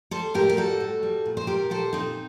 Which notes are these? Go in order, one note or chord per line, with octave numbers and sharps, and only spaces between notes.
G3 A4 C5
A2 G4 A#4
G4
G3 F#4 A4
A2
G3
A#2
C5
G3 G4 A#4
A#2 A4 C5
A#2 C4 D#4